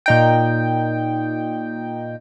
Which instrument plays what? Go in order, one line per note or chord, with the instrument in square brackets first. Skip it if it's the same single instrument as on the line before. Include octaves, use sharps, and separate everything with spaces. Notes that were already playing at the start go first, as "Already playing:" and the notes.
[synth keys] A#2 D#4 G5